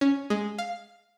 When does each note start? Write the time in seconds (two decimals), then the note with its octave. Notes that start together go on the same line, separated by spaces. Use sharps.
0.01 C#4
0.30 G#3
0.58 F5